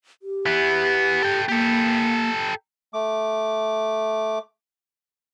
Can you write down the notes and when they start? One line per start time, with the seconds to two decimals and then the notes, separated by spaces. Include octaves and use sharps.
0.22 G4
0.46 E3 B3
1.22 A4 G5
1.49 A#3 G4 A4
2.93 A3 D6